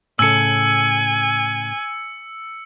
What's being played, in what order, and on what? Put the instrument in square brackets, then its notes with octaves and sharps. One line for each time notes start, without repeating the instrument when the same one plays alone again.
[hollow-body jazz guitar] A2 C#3 A4 [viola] G#5 [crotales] E6 C#7